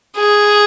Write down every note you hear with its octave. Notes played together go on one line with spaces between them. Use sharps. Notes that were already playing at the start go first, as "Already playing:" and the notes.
G#4